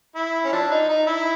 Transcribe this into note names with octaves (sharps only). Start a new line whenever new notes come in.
E4
C#4
F3 D4
D#4
D#4
E4